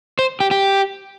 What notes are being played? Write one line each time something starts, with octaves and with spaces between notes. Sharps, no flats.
C5
G4
G4